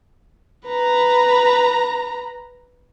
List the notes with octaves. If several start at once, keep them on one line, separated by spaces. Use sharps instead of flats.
B4 A#5